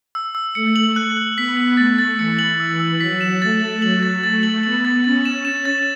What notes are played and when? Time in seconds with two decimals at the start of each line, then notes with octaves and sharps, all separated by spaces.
0.15 E6
0.35 E6
0.55 A3 C#7
0.76 F#7
0.96 F#6
1.17 F#6
1.37 B3 B6
1.57 F#7
1.77 A3 A6
1.99 A6
2.18 E3 C#7
2.39 F#7
2.59 E3 E6
2.80 E6
3.00 F#3 B6
3.21 E7
3.42 A3 A6
3.62 F#7
3.82 F#3 F#7
4.03 A6
4.23 A3 A6
4.43 F#7
4.63 B3 F#7
4.85 A6
5.04 C#4 A6
5.25 E7
5.45 E7
5.65 A6